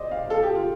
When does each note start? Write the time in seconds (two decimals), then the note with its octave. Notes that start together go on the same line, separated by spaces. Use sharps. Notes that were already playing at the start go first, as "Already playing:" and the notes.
Already playing: C5 D5 D#5
0.11 F5
0.30 A4
0.43 G4
0.55 F4